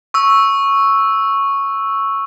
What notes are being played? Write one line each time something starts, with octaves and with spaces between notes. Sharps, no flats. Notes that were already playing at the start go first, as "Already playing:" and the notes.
C#6 E6